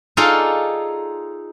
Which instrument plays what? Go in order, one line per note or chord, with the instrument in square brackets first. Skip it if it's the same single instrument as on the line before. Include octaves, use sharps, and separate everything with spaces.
[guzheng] D#4 F4 G#4 A4 D5 F5